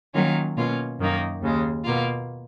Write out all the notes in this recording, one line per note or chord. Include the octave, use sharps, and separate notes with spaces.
D#3 F#3 A#3 C#4 F4
B2 A#3 C#4 F4
F#2 D#3 A#3 D#4
D#2 C#3 G#3
B2 A#3 F4